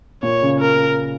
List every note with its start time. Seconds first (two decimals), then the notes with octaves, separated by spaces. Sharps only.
0.23 A#2 C#5
0.42 C#3
0.60 A#4